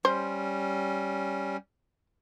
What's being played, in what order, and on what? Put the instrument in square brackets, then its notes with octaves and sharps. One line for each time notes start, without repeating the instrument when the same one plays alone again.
[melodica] G3 C#4 [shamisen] C5